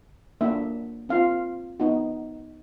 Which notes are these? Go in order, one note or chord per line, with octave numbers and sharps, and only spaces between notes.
A#3 D4 F#4 E5
C4 F4 F5
B3 D#4 F#4